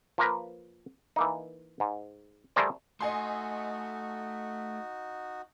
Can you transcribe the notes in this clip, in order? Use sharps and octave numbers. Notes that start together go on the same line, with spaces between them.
F3 A#3 A#4 B4
E3 A#3 D#4
G#2
G3 A3 G#4 A#4 C5 D5
A3 D#4 F#4 D#5 G#5 C6